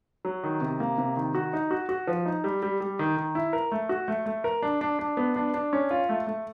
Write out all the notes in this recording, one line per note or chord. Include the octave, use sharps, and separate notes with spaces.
F#3
D#3
C3
A#3
C3
D#3
F#4
D#4
F#4
F#4
F3
D#4
G3
G3
G3
D#3
D#3
E4
A#4
A3
F#4
A3
A3
A#4
D4
D4
D4
B3
D4
D4
C#4
F4
A3
A3